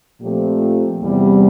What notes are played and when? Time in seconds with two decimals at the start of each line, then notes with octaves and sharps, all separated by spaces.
0.21 A#2 F3 A3 C4 G4
1.03 E2 C3 G3